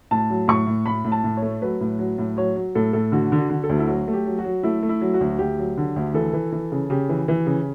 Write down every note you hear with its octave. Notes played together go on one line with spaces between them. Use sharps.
A2 A5
F#3
A2 C#6
A2
A2 B5
A2
A5
A2
C#5
A3
F#3 B4
A2
F#3
A2
F#3 C#5
F#3
A2 A4
A2 A4
D3 F#4
D3
F#4
D3
A4
D2
E4
F#3 F#4
A3
G4
F#3
F#4
F#3
A3 E4
A3
E4
F#3
F#4
D2
D2 G4
F#3
D3
D2
E3 A4
E3
E3
C#3
C#3 G4
E3
E3
C#3